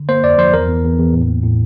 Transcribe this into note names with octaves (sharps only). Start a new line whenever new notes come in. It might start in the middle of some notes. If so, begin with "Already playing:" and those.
Already playing: D3
A#3 C5
F2 D5
F3 C5
E2 A#4
E2
E2
E2
A2
A#3
A2